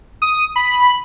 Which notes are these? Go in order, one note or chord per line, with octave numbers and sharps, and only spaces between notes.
D#6
B5